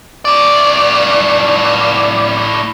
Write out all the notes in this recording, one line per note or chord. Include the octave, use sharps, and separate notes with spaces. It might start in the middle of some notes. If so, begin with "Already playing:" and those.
A2 D5